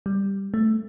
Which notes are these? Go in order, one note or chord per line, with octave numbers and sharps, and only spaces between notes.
G3
A3